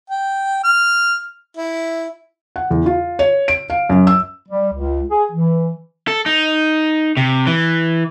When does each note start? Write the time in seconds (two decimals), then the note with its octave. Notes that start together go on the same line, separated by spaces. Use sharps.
0.10 G5
0.63 F6
1.57 E4
2.56 F#5
2.71 E2
2.86 F4
3.19 C#5
3.48 D7
3.70 F5
3.89 F#2
4.07 E6
4.49 G3
4.74 C#2
5.09 G#4
5.31 E3
6.08 A4
6.26 D#4
7.17 C3
7.47 E3